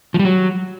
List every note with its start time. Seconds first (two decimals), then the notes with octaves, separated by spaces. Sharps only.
0.14 F3
0.19 G3
0.24 F#3